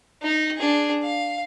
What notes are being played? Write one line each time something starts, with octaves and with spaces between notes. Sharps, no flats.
D#4
D4 G#4
F5